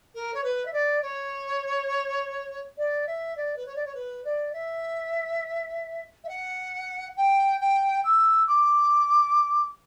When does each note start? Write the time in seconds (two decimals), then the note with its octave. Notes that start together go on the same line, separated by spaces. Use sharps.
0.14 A#4
0.34 C#5
0.43 B4
0.65 E5
0.73 D5
1.02 C#5
2.77 D5
3.06 E5
3.36 D5
3.56 B4
3.66 C#5
3.75 D5
3.85 C#5
3.94 B4
4.24 D5
4.53 E5
6.24 E5
6.28 F#5
7.16 G5
7.60 G5
8.04 E6
8.47 D6